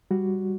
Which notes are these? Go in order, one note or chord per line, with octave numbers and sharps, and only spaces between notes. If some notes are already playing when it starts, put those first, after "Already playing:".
G3 F#4